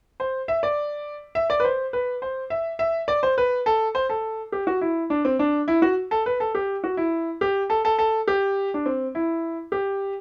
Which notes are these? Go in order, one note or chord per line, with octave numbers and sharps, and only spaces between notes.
C5
E5
D5
E5
D5
B4
C5
B4
C5
E5
E5
D5
C5
B4
A4
C5
A4
G4
F#4
E4
D4
C4
D4
E4
F#4
A4
B4
A4
G4
F#4
E4
G4
A4
A4
A4
G4
D4
C4
E4
G4